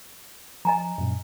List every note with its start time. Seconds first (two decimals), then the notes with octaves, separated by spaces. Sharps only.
0.65 F3 D#5 G#5 A#5
0.98 F#2 A#2